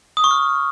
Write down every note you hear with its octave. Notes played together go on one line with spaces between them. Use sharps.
D#6
C#6
F6